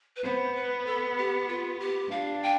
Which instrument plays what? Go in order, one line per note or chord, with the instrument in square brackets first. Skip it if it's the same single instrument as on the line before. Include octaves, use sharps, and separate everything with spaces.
[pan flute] B4
[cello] B3 [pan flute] C5
[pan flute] B4
A4
G4
F4
G4
[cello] D4 [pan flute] F5
[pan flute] G5